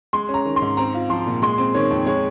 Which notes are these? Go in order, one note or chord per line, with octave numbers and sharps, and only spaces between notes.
G#3 C6
C#4
A#5
D#3
C6
G#2
C4 A#5
F4
F3 C6
A#2
G#3 C6
C4
D#3 C#5
F2
G#3 C#5